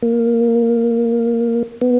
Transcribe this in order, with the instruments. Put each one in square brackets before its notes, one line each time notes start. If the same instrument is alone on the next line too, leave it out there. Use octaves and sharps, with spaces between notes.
[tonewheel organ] A#3
B3